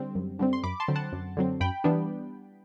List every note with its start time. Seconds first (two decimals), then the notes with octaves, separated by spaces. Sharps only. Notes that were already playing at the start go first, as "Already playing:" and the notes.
Already playing: D3 G3 C4
0.15 F#2
0.39 D3 G3 C4
0.53 C6
0.63 F#2 B5 D6
0.80 A5 C6
0.88 D3 F#3 C4
0.96 F#5 A5
1.12 F#2
1.37 D3 F#3 C4
1.60 F#2 G5 B5
1.84 E3 G3 B3 D4